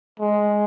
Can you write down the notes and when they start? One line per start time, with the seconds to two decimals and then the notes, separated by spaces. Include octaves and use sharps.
0.20 G#3